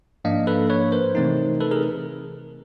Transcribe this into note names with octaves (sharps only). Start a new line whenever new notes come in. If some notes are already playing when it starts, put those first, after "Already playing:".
G#2 F3 A#3 D4 D#5 F5
A4 B4
B4 C#5
A#4 C5
C3 E3 A3 C4 D#4
A4 B4
G#4 A#4